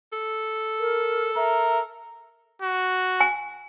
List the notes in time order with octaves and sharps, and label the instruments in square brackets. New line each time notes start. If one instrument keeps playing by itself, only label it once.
[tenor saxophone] A4
[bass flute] A#4
[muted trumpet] A#4 [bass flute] E5
[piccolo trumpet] F#4
[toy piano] G#5